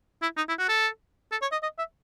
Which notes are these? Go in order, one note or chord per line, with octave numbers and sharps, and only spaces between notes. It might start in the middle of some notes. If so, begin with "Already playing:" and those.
E4
D#4
E4
F#4
A4
A4
C#5
D#5
D#5
E5